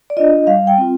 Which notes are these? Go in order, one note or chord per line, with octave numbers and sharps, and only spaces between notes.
D5
D4 F4 D#5
G3 F5
G5
C4 F4